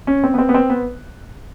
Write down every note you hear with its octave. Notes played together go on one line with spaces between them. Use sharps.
C#4
C4
B3
C4
B3
C4
B3